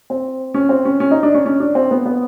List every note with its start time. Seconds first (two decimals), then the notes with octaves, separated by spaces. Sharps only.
0.10 C4
0.54 C#4
0.69 C4
0.85 C#4
1.00 C#4
1.11 D#4
1.23 D4
1.34 C#4
1.46 C#4
1.60 D4
1.75 C4
1.91 B3
2.06 B3